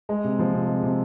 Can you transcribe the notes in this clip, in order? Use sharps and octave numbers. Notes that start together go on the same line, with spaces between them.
G#3
C3
F3
C3
G#3
C3